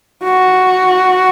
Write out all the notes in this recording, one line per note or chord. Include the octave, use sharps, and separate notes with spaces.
F#4